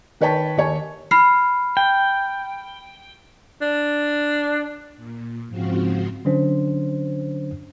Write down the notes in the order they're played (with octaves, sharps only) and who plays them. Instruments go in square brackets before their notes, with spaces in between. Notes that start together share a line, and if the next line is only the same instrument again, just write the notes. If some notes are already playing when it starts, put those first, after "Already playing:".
[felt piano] D#3 B4 C#5 G5 A5 B6
D#2 G4 C#5 G#5 A5
[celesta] B5 F6 C7
[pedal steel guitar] G5
[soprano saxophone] D4
[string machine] A#2
G#2 C#3 F3 C4 F4 F#4
[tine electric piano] D3 F#3 C#4 D4 C5